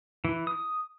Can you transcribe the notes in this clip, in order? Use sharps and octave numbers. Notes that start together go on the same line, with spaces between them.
E3
D#6